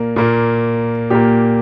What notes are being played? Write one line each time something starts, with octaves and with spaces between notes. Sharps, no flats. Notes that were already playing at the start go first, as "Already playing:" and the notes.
Already playing: A#2 A#3
A#2 A#3
A#2 A#3 G4